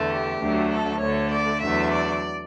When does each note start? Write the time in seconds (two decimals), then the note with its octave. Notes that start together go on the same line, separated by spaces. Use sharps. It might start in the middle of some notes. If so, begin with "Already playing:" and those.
Already playing: E2 D3 A3
0.10 G4
0.41 D2 D3 F#3 A3
0.71 A4
1.01 D2 D3 A3 C#5
1.32 D5
1.63 E2 D3 F#3 A3 E5
1.93 D5